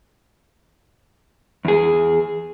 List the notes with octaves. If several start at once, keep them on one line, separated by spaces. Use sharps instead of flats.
E2 G#4